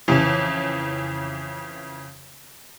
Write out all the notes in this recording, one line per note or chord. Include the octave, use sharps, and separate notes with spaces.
F2 C#3 E3